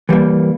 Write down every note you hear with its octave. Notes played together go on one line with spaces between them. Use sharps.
E3 G3 A#3